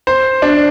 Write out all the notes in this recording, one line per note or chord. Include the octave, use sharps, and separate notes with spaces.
C5
D4